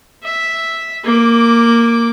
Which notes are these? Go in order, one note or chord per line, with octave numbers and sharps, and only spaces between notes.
E5
A#3 D6